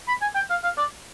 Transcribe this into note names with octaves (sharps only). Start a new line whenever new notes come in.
B5
G#5
G5
F5
F5
D5